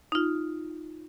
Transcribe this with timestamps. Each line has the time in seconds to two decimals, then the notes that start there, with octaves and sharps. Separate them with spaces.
0.12 D#4 F4